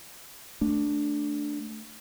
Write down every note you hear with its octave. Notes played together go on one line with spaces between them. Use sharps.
A3 D4